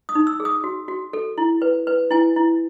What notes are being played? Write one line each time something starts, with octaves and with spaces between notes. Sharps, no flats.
D#6
D#4
E6
G#4
D#6
F#4
F#4
A4
E4
B4
B4
E4 G#5
E4